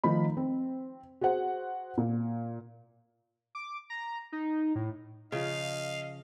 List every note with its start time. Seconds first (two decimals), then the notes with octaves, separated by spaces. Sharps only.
0.04 D#3 F3 A3 D#4 B5
0.37 C4
1.21 F#4 G#4 C5 F#5
1.98 A#2
3.55 D6
3.90 A#5
4.32 D#4
4.75 A2
5.32 C#3 F3 D#5 F5